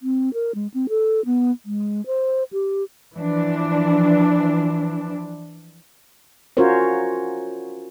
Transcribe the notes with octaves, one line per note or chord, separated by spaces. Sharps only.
C4
A#4
G#3
C4
A4
B3
G#3
C5
G4
E3 F3 D4
C#4 F4 F#4 A#4 C5 C#5